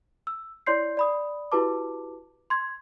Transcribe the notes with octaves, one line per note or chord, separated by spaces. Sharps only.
E6
E4 C#5 D5 C6 G6 C7
D5 B5 D#6
E4 F#4 G4 B4 A5 D6
C6 G#6